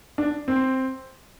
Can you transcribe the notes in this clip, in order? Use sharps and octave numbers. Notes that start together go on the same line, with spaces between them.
D4
C4